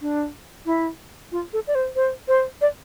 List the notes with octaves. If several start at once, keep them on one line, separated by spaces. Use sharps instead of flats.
D4
E4
F4
A4
D5
C5
C5
C5
D5